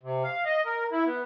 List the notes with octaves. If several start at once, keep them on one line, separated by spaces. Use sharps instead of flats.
C3
F5
D#5
A#4
E4
B3